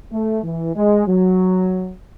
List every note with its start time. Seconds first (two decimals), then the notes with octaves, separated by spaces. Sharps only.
0.12 A3
0.43 E3
0.76 G#3
1.07 F#3